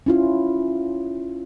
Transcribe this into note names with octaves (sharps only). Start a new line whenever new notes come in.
C#4 E4 F4